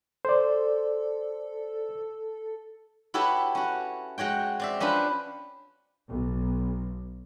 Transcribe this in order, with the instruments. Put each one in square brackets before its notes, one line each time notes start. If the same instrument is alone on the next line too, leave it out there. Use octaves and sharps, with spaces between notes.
[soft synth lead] A4 [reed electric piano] C5 D5
[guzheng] E4 F#4 G4 A4 B4 C#5
C#4 F#4
G#3 F#4 C#5 G5
C4 D5 E5
C#4 D4 F4 B4 C5
[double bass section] B1